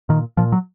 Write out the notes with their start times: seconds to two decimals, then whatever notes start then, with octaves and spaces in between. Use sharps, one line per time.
0.09 A#2 D#3
0.37 A#2 F3
0.52 F#3